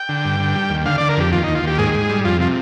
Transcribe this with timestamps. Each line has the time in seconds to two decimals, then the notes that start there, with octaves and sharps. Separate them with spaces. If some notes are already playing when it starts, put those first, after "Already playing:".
Already playing: G5
0.09 D3
0.25 G2
0.40 D3
0.55 G3
0.70 D#2
0.85 D3 F5
0.98 D3 D5
1.09 A#4
1.17 F2 G4
1.32 D#2 F4
1.44 D#2 D#4
1.55 F4
1.63 D#2 G4
1.78 G#2 G#4
1.93 G#2
2.09 G3
2.24 F2 F4
2.39 C3 F4